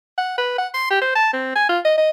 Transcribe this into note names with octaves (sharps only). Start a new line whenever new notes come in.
F#5
B4
F#5
C6
G4
C5
A5
C4
G#5
F4
D#5
D#5